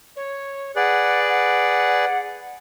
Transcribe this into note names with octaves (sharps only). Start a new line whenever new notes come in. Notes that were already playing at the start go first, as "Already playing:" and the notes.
C#5
G#4 B4 D5 F#5
F#5